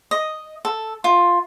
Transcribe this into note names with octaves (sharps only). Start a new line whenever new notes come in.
D#5
A4
F4